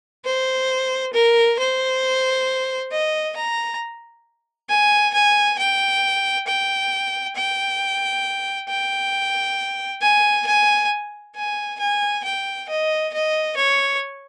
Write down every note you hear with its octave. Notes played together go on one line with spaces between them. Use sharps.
C5
A#4
C5
D#5
A#5
G#5
G#5
G5
G5
G5
G5
G#5
G#5
G#5
G#5
G5
D#5
D#5
C#5